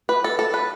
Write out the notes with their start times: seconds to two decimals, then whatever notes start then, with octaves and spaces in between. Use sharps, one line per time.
0.09 B4
0.24 A4
0.39 A4
0.54 B4